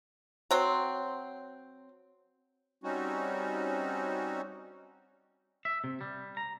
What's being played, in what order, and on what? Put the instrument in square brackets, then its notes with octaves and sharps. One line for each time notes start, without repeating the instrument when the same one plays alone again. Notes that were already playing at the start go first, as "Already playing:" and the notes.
[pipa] F#3 C4
[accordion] G3 C4 C#4 D#4 F#4
[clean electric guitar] E5
C3
G3
A#5